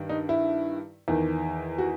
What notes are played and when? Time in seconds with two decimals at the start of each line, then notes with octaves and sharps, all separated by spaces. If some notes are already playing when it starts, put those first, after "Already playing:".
Already playing: G2 D#3
0.09 D#4
0.29 E4
1.08 E2 D#3
1.78 F#4